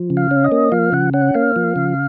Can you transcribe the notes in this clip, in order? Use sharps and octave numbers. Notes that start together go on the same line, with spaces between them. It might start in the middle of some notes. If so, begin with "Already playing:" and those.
Already playing: F3
C#3
F5
C#4
D#5
A#3
F3 F5
C#3 F#5
C#4 F#5
A#3 F5
F3
C#3